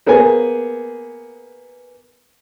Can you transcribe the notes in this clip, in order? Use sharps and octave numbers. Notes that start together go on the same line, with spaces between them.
A#3 B3 G#4 C5 G#5